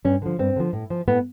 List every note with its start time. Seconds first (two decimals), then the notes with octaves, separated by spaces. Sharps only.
0.04 G2 C#4
0.22 D3 F3
0.39 G2 C4
0.56 D3 F3
0.73 A2
0.90 F3
1.08 A2 B3